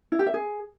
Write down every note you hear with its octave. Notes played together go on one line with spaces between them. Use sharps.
E4
G4
E5
G#4